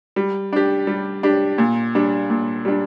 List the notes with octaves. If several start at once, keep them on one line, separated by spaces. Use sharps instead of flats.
G3
D4 G4
G3
D4 G4
A#2
G3 D4
A#2
G3 D4